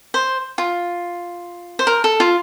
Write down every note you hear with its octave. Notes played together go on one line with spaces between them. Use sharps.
C5
F4
C5
A#4
A4
F4